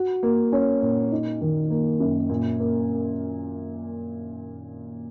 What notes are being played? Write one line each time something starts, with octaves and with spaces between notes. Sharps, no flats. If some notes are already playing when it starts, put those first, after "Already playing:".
Already playing: F#4
A#3
C#4
A#2
D#4
D#3
A#3
F#2
A#2
A#3